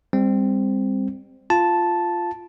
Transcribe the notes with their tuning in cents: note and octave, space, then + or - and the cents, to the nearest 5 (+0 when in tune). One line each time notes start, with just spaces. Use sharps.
G3 +35 C4 +0
F4 -5 A5 -5